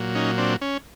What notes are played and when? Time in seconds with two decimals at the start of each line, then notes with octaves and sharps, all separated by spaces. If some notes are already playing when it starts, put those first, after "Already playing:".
Already playing: A#2 F#3
0.15 C#4 D#4
0.38 C4 D4
0.61 C#4